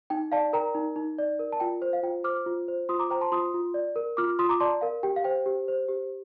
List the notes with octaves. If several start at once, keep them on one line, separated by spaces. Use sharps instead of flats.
D#4 G5
D5 F5 A5
A#4 G5 A#5
D#4
D#4
D5
A#4
A5
F4 G5
C5
F5
F4 G5
C5 D6 F6
F4
C5
F4 C6 D#6
A#5 D6
C5 G5 A#5
A5 C6
F4 C6 D#6
F4
D5
A#4
F4 D6 F6
F4 C6 D#6
A#5 D6
D5 A5 C6
A#4 F5
G4 G5
F5
C5 G5
G4
C5
G4